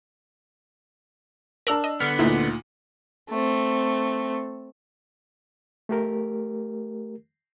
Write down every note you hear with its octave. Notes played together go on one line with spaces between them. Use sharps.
D4 A#4 E6 F#7
D#5
D3 B3 F6 C7 C#7
D2 A#2 D#4 E4
A3 C4
A3 G4 A#4